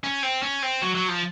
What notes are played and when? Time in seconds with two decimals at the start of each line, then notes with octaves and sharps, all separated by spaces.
0.04 C#4
0.23 C4
0.42 C#4
0.62 C4
0.82 F#3
0.95 F#3
1.08 F3